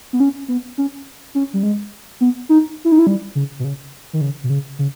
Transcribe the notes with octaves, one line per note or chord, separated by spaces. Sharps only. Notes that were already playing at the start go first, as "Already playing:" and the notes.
B3
C#4
B3
C#4
C#4
G3
G#3
B3
D#4
E4
D#4
E4
G3
C#3
B2
C#3
D#3
C#3
B2
C#3
C#3